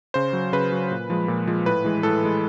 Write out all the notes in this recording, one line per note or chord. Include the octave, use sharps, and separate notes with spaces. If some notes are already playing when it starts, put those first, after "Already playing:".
C#3 C5
F#3
C#3 B4
F#3
A#2
F3 G#3
A#2
F3 G#3
A2 B4
E3 G#3
A2 A4
E3 G#3